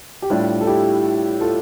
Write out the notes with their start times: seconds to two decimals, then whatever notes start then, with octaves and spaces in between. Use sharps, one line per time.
0.22 G4
0.30 A2 G3 D4 F4
0.61 A4
0.67 E4 G4
1.40 F4 A4